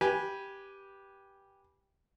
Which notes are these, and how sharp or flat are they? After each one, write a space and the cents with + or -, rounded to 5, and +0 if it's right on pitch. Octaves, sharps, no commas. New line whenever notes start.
G4 +0 B4 -15 G#5 +0